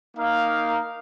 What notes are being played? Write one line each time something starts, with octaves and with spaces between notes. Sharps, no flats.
A#3 D#4 A#4 F5